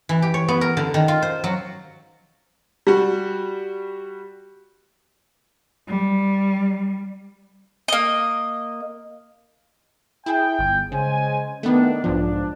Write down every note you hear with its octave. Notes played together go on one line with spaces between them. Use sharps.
E3
G4
C#5
B3
A#4
D3
D#3
F4
C5
F#3
G3 F#4
G3
A#3 D#5
E4 G#4 G5
G1
C#3 G#3 C5 G#5
D#3 A3 B3 D4
B1 G#2 F3 D4